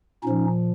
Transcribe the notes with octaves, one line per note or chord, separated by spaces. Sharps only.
A#2 F3 C#4 D#4